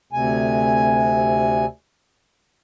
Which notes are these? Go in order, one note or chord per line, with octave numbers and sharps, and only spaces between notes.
D2 C3 G#5